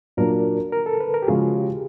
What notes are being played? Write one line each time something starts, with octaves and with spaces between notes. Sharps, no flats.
A#2 F#3 A#3 D4 A#4
A#4
A4
B4
A#4
G4
C#3 F3 G#3 C#4 F#4 G#4
G4